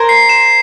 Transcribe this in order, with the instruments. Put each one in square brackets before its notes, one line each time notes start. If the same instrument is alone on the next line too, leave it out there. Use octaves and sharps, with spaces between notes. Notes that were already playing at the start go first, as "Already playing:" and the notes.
Already playing: [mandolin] A#4 C5 [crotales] G#6
[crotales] C7
E7